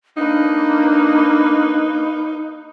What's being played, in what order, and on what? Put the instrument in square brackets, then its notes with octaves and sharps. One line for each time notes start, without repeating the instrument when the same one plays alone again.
[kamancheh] A#3 B4 [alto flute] D4 [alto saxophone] D#4